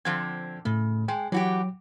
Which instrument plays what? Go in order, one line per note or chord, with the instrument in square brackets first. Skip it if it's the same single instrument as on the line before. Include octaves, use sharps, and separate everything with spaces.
[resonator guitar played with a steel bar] D3 F3 C4 [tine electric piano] G#6
[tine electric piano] A2 A3 [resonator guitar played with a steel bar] C#3
[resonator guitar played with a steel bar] G#3 [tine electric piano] G5
[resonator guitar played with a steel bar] E3 F#4 G4 [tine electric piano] F#3